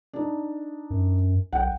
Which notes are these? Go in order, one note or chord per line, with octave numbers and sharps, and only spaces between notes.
D4 D#4
F#2
B1 F#5 G5